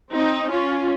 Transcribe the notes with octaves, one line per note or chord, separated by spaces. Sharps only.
C4 D#4
C#4 F4